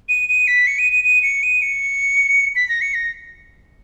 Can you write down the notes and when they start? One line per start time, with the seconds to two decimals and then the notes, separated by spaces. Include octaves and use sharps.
0.09 D#7
0.29 D#7
0.47 B6
0.67 C#7
0.79 D#7
0.92 D#7
1.05 D#7
1.23 C#7
1.43 D#7
1.62 C#7
2.56 B6
2.69 A#6
2.81 C#7
2.94 A#6